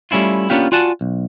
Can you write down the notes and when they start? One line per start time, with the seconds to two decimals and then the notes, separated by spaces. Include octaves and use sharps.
0.11 G3 A3 C#4 E4 F4
0.50 A#3 B3 C#4 D4 F4 G4
0.72 F4 F#4 D5 F#5 G#5 A5
1.01 B1